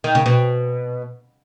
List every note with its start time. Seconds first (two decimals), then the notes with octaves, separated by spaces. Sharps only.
0.04 D#3
0.15 C#3
0.26 B2